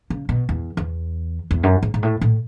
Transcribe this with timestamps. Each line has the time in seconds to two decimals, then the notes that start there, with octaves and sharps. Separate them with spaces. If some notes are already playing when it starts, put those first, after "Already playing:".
0.10 C#3
0.29 B2
0.49 E2
0.77 E2
1.51 E2
1.63 F#2
1.83 G#2
1.94 G#2
2.03 A2
2.21 A2